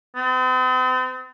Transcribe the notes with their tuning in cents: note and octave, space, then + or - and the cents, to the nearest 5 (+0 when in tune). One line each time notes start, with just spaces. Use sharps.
C4 -45